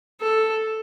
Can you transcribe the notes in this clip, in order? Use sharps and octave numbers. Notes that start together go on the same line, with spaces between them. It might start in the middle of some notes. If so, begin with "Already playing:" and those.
A4